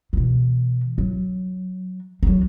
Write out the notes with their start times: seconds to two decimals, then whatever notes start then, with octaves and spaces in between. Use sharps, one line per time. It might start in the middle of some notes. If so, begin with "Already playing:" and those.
0.13 B2 E3
0.98 F#3
2.23 F#3 D#4